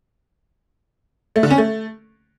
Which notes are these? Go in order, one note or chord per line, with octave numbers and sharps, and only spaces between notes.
A3
D3
C#4
A3